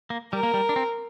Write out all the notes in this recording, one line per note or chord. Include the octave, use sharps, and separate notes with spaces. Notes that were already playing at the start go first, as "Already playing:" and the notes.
A#3
G3 A#4
A#3
G3
D4
C4